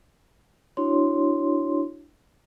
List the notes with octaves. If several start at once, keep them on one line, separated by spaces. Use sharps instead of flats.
D4 E4 F#4 C#5 C6